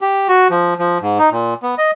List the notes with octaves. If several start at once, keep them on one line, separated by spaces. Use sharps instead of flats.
G4
F#4
F3
F3
G#2
D#4
A#2
B3
D#5